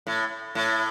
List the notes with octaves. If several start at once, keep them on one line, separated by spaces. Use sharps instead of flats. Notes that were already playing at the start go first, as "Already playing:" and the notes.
A2
A2